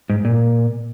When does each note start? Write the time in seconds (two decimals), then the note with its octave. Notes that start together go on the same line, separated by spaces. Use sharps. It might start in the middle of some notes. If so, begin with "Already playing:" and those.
0.10 G#2
0.25 A#2